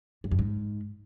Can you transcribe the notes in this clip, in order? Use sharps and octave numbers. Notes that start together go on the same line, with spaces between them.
G2
F#2
G#2